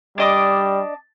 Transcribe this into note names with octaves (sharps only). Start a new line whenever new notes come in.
G3 D4 D#5 D6